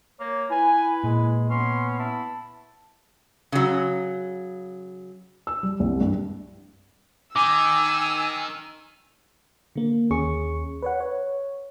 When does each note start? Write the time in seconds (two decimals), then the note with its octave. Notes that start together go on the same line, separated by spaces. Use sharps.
0.20 A#3 C#5
0.50 E4 B4 G#5
1.04 A#2 G#3
1.50 B3 C#4 C6
1.99 E4 A5
3.52 C#3 F#3
5.47 E6
5.63 G3
5.80 C2
6.01 G2
7.36 D#3 G#5 D6 E6
9.76 D3 A#3
10.10 D#2 C#4 G#4 C#6
10.82 B4 C#5 F#5
11.00 C#5